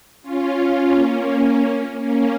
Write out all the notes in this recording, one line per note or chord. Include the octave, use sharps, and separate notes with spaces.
C#4 F4
A#3 C#4
A#3 C#4